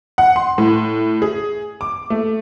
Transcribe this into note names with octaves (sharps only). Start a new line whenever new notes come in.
F#5
C6
A2
G#4
D6
A3